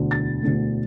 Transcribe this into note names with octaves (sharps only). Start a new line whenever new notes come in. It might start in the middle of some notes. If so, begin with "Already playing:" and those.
Already playing: E1 D2 D3
A6
E1 D2 D3 A3